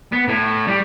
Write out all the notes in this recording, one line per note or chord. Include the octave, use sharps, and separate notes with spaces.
B3
A2
G3